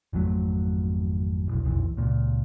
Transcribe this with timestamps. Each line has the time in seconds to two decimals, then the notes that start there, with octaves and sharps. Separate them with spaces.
0.13 G#1 F2 F#3 A3
1.48 E1 B1
1.65 D#1 B1 F2 E3
1.97 C#2 A#2